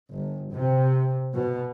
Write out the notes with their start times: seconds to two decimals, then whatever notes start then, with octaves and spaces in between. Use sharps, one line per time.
0.13 G1
0.52 C3
1.35 B2